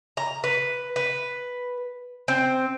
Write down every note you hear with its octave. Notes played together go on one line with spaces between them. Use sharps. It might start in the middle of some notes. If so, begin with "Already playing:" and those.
A#5
B4
B4
C4